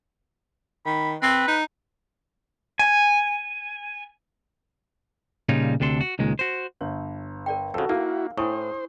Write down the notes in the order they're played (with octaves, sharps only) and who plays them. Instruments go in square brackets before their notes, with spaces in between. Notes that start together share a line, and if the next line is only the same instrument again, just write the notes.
[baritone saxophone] D#3 [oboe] B5
[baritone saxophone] C4 [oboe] B4
[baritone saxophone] D#4
[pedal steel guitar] G#5
[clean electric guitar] A#2 C#3 G3 D#4 F4 C#5
D2 C3 D4 A4 C6
F#4
C#2 A#2 D#3 G#3
F#4 C5
[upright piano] G1 [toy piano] C#5
[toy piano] A#4 D5 G5
[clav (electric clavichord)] F2 C#3 [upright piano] F#4 A4
[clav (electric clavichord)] A#3 [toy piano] D#4 A#4 [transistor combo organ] E4 F#4 [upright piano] F5
[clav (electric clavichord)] A2 [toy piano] D4 E4 C#6 [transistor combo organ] C5 [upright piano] D#6